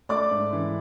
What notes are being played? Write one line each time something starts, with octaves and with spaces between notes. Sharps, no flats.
A3 D5 D6
G#2
E3